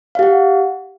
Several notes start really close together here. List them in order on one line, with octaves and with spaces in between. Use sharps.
F5 G4 F#5